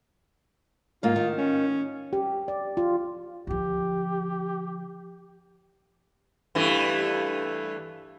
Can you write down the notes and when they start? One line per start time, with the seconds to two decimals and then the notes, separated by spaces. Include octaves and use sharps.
1.03 G#2 A#3 F4
1.16 D#3
1.37 C#4
2.13 G4
2.48 D5
2.77 F4
3.47 D3 F3 G4
6.55 G2 E3 A3